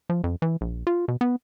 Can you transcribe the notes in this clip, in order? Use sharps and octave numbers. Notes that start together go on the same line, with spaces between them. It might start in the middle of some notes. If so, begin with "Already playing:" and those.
F3
F2
E3
A#1
F4
B2
B3